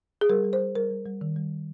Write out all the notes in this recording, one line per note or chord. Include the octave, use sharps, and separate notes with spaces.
G#4
G3 A#4
G3
C5
G3
G3 A#4
G3
G3
D#3
G3